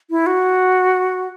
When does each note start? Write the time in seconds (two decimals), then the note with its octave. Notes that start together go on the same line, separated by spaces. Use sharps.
0.10 E4
0.26 F#4